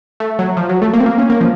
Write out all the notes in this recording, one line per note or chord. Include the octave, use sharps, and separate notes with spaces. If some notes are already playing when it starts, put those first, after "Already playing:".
A3
F#3
F3
F#3
A3
A#3
C4
A#3
C#4
A#3
F3